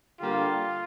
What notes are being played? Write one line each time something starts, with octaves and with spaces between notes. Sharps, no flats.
D3 G3 A#3 F4 G4 D5